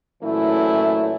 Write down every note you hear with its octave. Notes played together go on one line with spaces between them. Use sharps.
A#2 E3 F#3 A3 C#4 E4